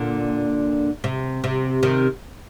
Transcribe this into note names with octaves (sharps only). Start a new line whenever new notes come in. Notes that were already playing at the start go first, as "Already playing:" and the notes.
Already playing: A#2 D3
C3
C3
C3 D#3